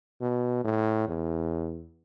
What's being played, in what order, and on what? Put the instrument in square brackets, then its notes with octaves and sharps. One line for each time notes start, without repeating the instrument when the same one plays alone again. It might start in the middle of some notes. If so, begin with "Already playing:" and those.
[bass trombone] B2
A2
E2